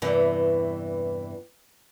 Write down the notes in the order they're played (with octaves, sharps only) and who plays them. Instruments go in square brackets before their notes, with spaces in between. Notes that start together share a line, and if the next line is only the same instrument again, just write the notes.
[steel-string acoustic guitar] E2 G2 C3 E3